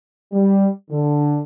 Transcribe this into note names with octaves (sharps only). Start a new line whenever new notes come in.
G3
D3